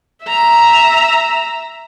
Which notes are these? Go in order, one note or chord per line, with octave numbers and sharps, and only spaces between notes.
E5 A#5